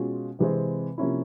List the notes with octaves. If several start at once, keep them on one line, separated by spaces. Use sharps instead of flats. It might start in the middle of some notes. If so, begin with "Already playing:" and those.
Already playing: B2 G#3 C#4 F4
C3 E3 G#3 C4
C3 F3 A#3 C#4 E4